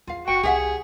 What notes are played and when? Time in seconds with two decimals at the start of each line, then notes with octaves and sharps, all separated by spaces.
0.07 E2 F4 F5
0.28 F#1 F#4 G5 C#6
0.43 C2 G4 G#4 E5 F#5